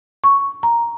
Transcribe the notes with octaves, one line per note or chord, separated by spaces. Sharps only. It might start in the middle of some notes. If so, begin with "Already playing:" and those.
C#6
A#5